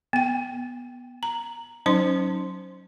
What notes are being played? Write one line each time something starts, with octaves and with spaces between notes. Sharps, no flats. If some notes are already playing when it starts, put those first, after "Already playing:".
B3 G5
A#5
F#3 C#4 D#4 C5 C6